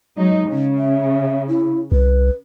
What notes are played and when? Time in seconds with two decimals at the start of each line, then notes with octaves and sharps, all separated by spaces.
0.17 F#3 G#3 D#4
0.47 C#3
0.78 E5
1.48 E4
1.92 C2 B4